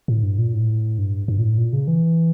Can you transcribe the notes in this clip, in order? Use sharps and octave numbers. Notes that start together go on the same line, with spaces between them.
A2
G2
A#2
A2
G2
G2
A#2
A2
A#2
C#3
E3